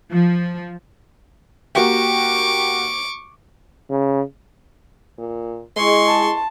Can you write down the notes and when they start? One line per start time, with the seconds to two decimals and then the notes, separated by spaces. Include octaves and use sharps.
0.12 F3
1.75 A#3 F#4 G4 C#6 D6
3.90 C#3
5.18 A#2
5.76 G#3 E4 G#4 D#5 C6 C#6
6.08 A5